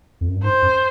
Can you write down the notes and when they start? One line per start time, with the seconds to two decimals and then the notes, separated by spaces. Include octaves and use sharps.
0.21 F2
0.29 F#2
0.36 G2
0.43 G#2 C5
0.62 F#2